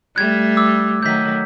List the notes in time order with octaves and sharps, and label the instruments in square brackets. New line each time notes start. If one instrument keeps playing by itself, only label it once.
[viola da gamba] G3 A3 [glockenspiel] F#6 G#6
[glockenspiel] D6 E6
[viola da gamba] D#3 F#3 A3 [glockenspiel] G6 B6